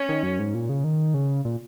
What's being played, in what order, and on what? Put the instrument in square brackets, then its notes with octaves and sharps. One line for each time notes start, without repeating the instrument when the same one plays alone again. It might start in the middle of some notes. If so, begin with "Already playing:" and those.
Already playing: [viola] C#4
[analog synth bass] D#3
F#2
G#2
A#2
C#3
D#3
C#3
A#2